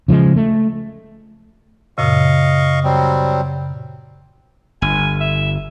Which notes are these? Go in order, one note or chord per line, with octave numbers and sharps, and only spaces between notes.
C#3 F3 G3 G#3
A3
F#2 A#2 C#3 D#5 F5 C#6
F#3 G3 C4
G1 G#5
E5